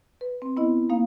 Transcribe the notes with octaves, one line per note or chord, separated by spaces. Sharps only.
B4
C4
B3 E4 D#5
A#3 D#4 F5